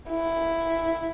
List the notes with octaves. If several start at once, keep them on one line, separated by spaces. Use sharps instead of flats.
E4